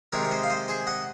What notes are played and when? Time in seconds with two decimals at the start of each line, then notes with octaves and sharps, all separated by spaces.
0.12 C3 D#3 G#3 A#4 C#5
0.25 C#5
0.31 C5 D#5
0.43 F5
0.50 C5 D#5
0.68 G#4 C5
0.87 D#5 F#5